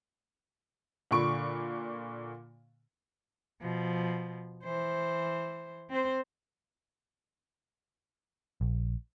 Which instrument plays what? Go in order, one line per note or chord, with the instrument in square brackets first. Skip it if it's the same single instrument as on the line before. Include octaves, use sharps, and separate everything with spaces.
[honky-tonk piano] A#2 D3 B5 C#6 D7
[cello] B2 F3
E3 C5
C4 C5
[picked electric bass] A#1